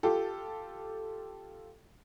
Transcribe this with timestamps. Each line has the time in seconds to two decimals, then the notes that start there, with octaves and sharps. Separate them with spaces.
0.03 F4 G4 A4